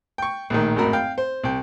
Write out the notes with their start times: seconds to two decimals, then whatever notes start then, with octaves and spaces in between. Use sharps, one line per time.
0.18 G5 C#6
0.50 A#1 A2 D#3
0.76 G#1 F#2 A2 F#4 A#4 B5
0.93 F5 G5
1.18 C5
1.43 C2 G5